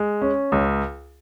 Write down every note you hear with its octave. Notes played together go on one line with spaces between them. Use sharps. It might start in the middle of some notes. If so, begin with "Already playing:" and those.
Already playing: G#3
C#4
C#2